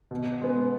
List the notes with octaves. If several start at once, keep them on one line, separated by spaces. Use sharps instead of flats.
B2
G#3 B3